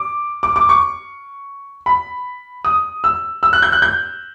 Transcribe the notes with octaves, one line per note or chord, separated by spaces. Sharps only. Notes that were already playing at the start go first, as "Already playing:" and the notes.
Already playing: D6
D6
D6
C#6
B5
D#6
E6
E6
F#6
G6
F#6
G6